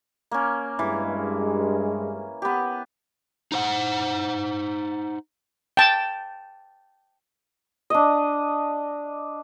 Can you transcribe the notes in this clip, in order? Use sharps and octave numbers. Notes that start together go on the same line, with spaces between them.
A#3 C#4
G2 E3 G#3
B3 G4
D#4 C5 F#5
G5 A5
D4 D#5